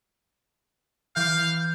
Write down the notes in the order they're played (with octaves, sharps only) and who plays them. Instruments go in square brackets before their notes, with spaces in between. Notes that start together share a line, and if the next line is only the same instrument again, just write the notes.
[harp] E3 D6 F#6 [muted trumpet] F5 [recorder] G6